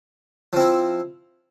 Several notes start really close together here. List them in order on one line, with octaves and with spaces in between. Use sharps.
F3 C4 E4